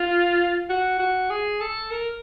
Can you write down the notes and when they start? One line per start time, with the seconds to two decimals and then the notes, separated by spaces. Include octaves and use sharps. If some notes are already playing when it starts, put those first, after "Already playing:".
Already playing: F4
0.70 F#4
1.00 F#4
1.30 G#4
1.61 A4
1.91 A#4